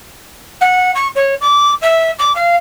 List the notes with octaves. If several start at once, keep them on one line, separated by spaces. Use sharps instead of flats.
F#5
C#6
C#5
D6
E5
D6
F5